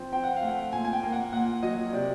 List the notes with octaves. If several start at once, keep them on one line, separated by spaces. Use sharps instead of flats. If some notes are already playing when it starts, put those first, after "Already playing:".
Already playing: F3 C4
C4 G5
F#5
F5
A3 F#5
A#2 G#5
G#5
G5
A#3
F#5
A#2 F#5
F#3 D#5
C3 D5